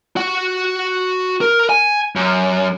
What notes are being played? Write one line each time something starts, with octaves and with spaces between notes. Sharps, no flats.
F#4 F#5
A#4
G#5
F#2